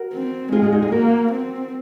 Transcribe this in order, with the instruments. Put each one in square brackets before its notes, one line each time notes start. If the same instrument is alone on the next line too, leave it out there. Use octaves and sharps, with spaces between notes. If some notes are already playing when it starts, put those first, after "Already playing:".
Already playing: [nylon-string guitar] F#4 A#4
[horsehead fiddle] C4
[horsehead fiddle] G#3 [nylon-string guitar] F4 G#4
[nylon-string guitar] F4 G#4
D#4 F#4
F4 G#4
[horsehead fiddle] A#3 [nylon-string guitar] F#4 A#4
[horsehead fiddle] C4